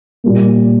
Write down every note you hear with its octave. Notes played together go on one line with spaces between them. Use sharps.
A#2 G3 A#3